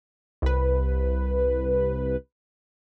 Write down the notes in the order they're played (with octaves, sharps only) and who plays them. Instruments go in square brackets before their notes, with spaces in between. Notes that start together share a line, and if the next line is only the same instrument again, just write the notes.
[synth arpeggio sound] C2 B4